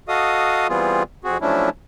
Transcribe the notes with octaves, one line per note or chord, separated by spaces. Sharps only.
F#4 A4 D#5 F5 D#6
E3 G3 B3 C4 F4 G#4
F2 C4 F#4 G#4
F3 F#3 A3 C#4 D4 E4